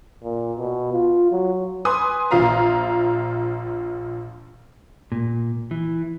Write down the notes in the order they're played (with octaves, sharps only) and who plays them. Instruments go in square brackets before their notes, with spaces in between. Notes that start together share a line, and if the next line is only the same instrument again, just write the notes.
[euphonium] A#2
B2
F4
F#3
[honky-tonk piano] B4 G#5 C6 D#6
A#1 F4 F5 A#5
[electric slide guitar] A#2
E3